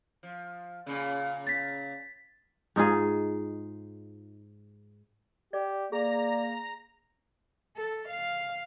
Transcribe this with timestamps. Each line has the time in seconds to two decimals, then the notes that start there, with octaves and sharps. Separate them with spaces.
0.23 F3
0.86 A#2 C#3
1.47 A6 B6
2.76 G#2 D#4 F4 G#4
5.53 G4 D5
5.92 A#3 G#4 D5 A#5
7.77 A4
8.09 F5